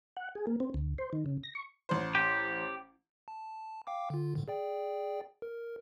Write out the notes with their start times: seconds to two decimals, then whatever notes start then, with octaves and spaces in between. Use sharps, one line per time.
0.17 F#5
0.35 G#4
0.47 A#3
0.60 C4
0.74 D2
0.98 C5
1.13 D#3
1.26 C#3
1.43 A#6
1.55 C#6
1.89 A1 C5
2.15 G4
3.28 A5
3.87 F5 G5 D6
4.10 D3 F4
4.35 A2 D3 D#3
4.48 G#4 D5 G5
5.42 A#4